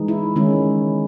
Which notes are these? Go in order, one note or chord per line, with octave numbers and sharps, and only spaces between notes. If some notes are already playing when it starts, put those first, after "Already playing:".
Already playing: E3 G#3 D#4
E4
D#3 G#3 C#4 E4